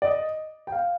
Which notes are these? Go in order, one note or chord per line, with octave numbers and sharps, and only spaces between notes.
D5
D#5
G5
F5